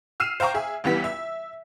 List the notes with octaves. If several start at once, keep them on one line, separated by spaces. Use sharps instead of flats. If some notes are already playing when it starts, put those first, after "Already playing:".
E6 F6 C7 D#7 E7
C5 F5 G5 A#5 C#6 D6
G#4 E5
C#2 E3 G3 B3 B6
E5